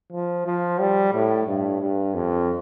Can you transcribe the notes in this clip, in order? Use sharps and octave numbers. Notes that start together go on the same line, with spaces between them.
F3
F3
G3
A2
G2
G2
F2